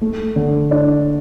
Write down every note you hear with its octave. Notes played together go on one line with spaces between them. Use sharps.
A3
D3
D4